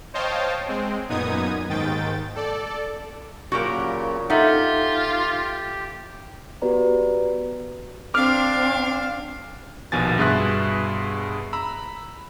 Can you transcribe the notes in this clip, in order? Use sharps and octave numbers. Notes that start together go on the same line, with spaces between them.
C5 C#5 D#5 F5 G5 A5
G#3 C4
F#2 A#2 B3 D#4 D#6 G#6
D#2 G#2 D#3 G5 A6
A4 D5
A#2 C#3 F#3 F#4 G4 A#4
D#4 F4 G4 A4 E5 F#5
B3 F#4 G4 B4 D5 A#5
C4 D4 F5 D6 F6
A#1 D#2 B2 G#5 A6
G2 B2 G#4 E5 C6 F#6
A#5 B5 E6